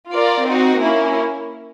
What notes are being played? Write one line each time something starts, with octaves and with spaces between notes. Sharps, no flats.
F4 A#4 D5
C4 D#4 F#4
A#3 C#4 E4